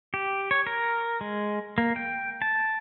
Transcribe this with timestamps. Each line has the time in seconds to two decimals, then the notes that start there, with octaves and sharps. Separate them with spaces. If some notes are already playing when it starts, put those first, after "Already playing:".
0.14 G4
0.51 C#5
0.67 A#4
1.21 G#3
1.78 A#3
1.96 G5
2.42 A5